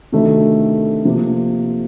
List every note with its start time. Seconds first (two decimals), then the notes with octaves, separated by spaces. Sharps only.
0.12 D2 C3 D#3 A3
1.05 C3 F3 A#3